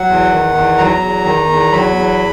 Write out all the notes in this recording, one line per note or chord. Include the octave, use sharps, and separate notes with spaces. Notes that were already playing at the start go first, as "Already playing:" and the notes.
Already playing: F#3 F#5
E2
D#3
E2
F#3 A#5
E2
D#3
E2
F#3 B5
E2